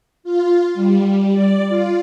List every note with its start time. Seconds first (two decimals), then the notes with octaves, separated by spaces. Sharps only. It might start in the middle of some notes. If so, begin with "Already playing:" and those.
0.24 F4
0.74 G3
1.32 D5
1.69 F4